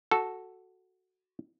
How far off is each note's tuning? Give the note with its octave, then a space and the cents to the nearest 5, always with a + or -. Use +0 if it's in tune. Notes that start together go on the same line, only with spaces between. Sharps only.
F#4 +0 A4 +0